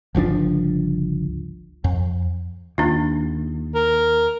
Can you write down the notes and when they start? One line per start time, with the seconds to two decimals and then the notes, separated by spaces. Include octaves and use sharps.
0.15 G1 C#2 F3 D4
1.84 F2
2.78 D#2 D4 F4
3.75 A#4